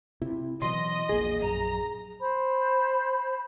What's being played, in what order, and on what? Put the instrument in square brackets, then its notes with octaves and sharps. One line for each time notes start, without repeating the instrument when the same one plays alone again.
[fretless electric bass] C3 [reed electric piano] E4
[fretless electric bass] B2 E3 F#3 [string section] D#5 [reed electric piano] C6
[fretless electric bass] E1 A#1 A#3 [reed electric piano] G#4
[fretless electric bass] A#1 F#2 [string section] A#5
[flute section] C5 B5